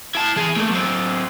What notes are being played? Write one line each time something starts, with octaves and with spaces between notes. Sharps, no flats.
E4 A5
E3 G#4
A3 A#3
F#3 C4